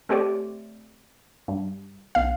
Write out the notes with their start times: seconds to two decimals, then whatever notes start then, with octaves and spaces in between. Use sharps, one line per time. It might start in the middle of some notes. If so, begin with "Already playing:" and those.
0.09 A3 C4 G4 C#5 D5
1.48 G2
2.15 B1 F5